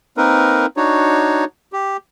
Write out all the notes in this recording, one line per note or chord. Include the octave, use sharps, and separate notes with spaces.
A#3 C4 D#4 A#4 B4
D4 D#4 F#4 C#5
G4